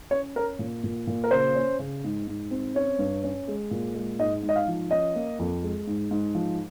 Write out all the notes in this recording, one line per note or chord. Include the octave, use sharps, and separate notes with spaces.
C#4 C#5
C#4 A#4
A#2
A#2
A#2
A#4
C#3 C5
C#4
C#3
G#2
G#2
C4
C#4 C#5
G2
C#4
G#3
A#2
G#3
G#2 D#5
G#2
D#5
F5
F3
C#4 D#5
A#3
F2
G#3
G#2
G#2
F3